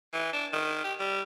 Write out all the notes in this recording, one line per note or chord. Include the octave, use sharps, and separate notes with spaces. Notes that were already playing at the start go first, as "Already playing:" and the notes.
E3
D4
D#3
G4
G3